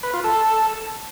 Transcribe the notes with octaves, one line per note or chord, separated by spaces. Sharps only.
B4
F4
A4